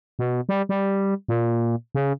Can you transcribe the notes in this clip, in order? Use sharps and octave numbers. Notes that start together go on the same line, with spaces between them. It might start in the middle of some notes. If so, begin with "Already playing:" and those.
B2
G3
G3
A#2
C#3